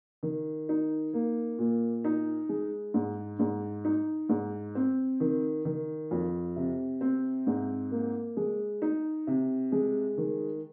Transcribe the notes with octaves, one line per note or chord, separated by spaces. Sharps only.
D#3
D#4
A#3
A#2
D#4
G#3
G#2
G#2
D#4
G#2
C4
D#3
D#3
F2
C3
C4
G#2
A#3
G#3
D#4
C3
G#3
D#3